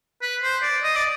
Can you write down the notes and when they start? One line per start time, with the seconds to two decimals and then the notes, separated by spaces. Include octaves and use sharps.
0.22 B4
0.43 C5
0.63 D5
0.84 D#5
0.96 D5